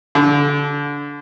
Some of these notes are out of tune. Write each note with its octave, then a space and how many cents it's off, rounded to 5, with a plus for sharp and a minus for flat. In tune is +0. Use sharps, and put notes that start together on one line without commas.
D3 -25